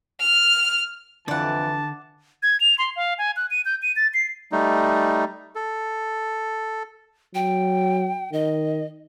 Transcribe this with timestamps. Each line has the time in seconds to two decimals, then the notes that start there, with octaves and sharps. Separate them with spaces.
0.20 F6
1.28 F2 D3 E3 D5 F#5 A5
2.43 G#6
2.60 F7
2.78 C6
2.96 F5
3.18 G#5
3.36 F#6
3.51 D#7
3.65 G6
3.82 D#7
3.96 A6
4.14 C7
4.52 G3 A3 D#4
5.55 A4
7.35 F#3 G5
8.33 D#3 D#5